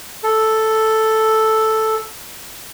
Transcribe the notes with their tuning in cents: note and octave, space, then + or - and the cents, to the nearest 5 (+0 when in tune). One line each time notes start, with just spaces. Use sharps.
A4 +0